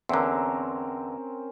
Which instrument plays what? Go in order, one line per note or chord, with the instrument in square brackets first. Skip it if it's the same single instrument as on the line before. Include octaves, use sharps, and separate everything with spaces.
[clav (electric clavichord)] E2 D3 [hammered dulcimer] C4 C#4 A#4